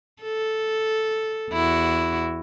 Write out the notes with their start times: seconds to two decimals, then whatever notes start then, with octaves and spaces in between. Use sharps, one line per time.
0.22 A4
1.51 E2 E4 F#4